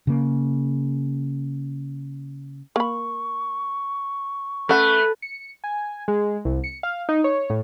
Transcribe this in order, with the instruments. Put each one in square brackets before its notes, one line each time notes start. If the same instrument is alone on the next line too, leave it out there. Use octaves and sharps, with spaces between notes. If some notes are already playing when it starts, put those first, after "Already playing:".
[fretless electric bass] C#3 A#3
[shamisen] A#3 B5 [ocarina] C#6
[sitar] A3 [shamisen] C#4 F#5 [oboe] B4
[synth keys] C#7
G#5
G#3
C2
C#7
F5
D#4
C#5
A2